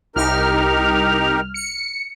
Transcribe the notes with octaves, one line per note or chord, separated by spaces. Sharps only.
C2 D#4 G4 A#4 F6
C#7